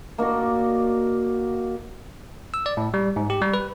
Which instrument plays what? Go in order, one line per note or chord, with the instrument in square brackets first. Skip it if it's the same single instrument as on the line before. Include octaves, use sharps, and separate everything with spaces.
[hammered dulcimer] A#3 D#4 F#4 D5
[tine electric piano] E6
D5
A2
G3
G#2
G4
G3
B4